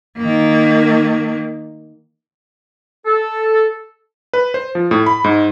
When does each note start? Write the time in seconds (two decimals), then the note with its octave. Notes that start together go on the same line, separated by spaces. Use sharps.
0.17 D#3 A#3
3.05 A4
4.34 B4
4.54 C5
4.75 F3
4.91 A2
5.06 B5
5.24 G#2